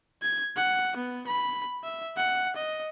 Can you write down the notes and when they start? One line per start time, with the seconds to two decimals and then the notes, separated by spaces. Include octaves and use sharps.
0.23 G#6
0.56 F#5
0.97 B3
1.27 B5
1.84 E5
2.17 F#5
2.56 D#5